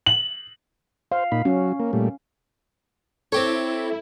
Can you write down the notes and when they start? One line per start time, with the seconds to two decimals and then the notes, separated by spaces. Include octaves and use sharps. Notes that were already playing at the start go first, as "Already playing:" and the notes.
0.06 F#7
1.12 C5 F5
1.32 A#2 D#4 B5
1.45 F#3 C#4
1.80 A#3
1.93 A#2 G3 A3
3.32 C4 E4 G4 A4 C#5